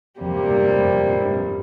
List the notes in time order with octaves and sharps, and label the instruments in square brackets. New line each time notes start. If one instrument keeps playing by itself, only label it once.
[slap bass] F2 [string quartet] C3 G3 A#3
[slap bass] F2
G2
F2
F2
A2
G2
F2